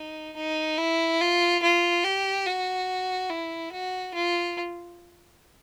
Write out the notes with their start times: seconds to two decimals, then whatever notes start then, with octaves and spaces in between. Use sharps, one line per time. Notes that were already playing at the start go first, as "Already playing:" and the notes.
Already playing: D#4
0.36 D#4
0.78 E4
1.20 F4
1.62 F4
2.04 G4
2.46 F#4
3.30 E4
3.73 F#4
4.15 F4